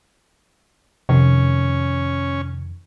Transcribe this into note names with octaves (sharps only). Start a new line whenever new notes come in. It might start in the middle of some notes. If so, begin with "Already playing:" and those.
F2 C3 D#3 C#4